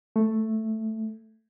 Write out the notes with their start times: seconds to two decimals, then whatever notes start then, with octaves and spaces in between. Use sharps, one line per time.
0.16 A3